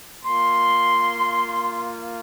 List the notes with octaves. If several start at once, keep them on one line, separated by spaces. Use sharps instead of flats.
A#3 F4 C6